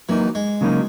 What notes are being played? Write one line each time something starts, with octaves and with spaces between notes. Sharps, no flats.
E3 F#3 A#3 D#4
G#3
C#3 F#3 A#3 D#4